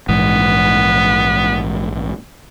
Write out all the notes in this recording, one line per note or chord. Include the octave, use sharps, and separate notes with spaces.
A#1 G#2 E3 B3